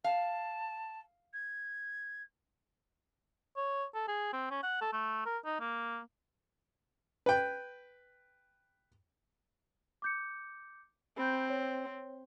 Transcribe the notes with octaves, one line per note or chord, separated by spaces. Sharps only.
F5 A5
G#6
C#5
A4
G#4
C4
C#4
F#5
A4
A3
A#4
D#4
A#3
B4 G5
D6 G6 C#7
C4 B5 G6
C#5